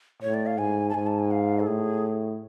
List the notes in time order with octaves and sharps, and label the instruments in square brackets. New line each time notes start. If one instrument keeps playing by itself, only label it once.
[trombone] A2 [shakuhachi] C#5
[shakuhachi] D5
F5
[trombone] G#2 [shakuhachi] G#5
[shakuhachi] A5
[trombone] G#2 [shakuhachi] G#5
[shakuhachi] A5
G#5
F5
A4
[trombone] A2 [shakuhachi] G#4